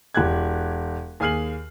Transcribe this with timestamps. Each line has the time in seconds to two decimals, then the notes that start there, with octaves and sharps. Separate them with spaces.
0.15 E1 G4 F#6 G#6
1.20 D#2 G#4 G#5 F6 C7 F#7